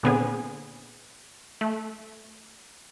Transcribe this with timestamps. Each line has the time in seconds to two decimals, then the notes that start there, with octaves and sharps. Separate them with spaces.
0.03 A#2 D3 B3 C4 G#4
1.61 A3